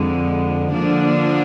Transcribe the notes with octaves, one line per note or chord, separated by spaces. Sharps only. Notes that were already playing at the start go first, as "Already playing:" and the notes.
Already playing: F2 D3 G#3
D3 F3 A#3 D4